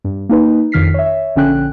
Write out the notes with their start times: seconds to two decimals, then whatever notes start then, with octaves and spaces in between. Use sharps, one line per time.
0.04 G2
0.29 A#3 D#4 B4
0.72 G1 F2 D#3 F6 B6 C7
0.94 C#5 E5
1.36 A#1 D3 C#4 G5 F#6